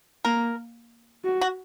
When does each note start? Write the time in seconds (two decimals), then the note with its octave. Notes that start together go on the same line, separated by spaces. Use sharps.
0.25 A#3 A#4
1.24 F#4
1.41 F#4